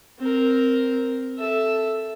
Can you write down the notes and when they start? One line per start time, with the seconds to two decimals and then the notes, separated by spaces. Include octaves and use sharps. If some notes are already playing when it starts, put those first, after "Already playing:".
0.19 C4 A#4
1.39 A4 E5